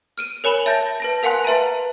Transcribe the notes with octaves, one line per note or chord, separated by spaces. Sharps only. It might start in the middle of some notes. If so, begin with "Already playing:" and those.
F6 D7 D#7
A#4 C#5 G#5 B5 F#7 G7
E5 A5 G6 A#6
B4 A5 A#6
A#4 F5 F#5 G#5 C6 F#6
B4 E5 A5 A#5